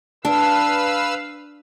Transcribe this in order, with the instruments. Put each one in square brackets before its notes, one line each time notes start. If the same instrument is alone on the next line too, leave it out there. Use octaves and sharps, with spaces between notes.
[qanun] D4 [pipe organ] B4 F5 E6